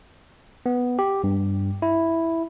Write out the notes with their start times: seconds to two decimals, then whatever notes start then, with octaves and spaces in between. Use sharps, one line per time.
0.66 B3
0.99 G4
1.24 G2
1.82 E4